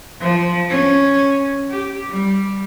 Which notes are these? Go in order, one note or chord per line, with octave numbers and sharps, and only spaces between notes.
F3
C#4
G4
G3